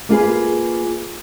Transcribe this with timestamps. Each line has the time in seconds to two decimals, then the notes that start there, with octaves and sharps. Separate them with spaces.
0.09 A#3 F4 G#4 B4